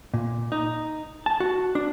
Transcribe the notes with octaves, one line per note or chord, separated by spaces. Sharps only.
A#2
D#4
A5
F#4
D4